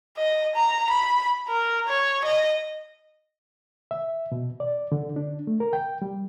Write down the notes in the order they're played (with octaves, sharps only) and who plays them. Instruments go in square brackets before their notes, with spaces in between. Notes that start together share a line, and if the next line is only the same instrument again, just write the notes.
[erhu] D#5
A#5
B5
A#4
C#5
D#5
[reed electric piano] E5
B2
D5
D3
D4
A3
A#4
G5
G3